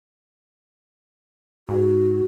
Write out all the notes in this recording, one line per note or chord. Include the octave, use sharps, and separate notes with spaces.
G#2 F#4